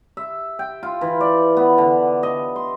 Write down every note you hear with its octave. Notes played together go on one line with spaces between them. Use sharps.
E5
G5
F4
E3
D5
B3
D3
D#5
C6